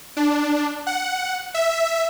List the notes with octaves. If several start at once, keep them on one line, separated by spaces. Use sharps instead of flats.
D4
F#5
E5